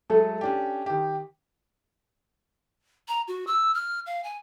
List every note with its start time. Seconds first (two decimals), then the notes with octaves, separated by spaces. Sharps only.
0.10 F#3 G#3 A3 A4
0.41 C#4 D4 G4
0.86 D#3 G4
3.08 A#5
3.28 F#4
3.47 E6
3.74 F6
4.06 F5
4.24 G#5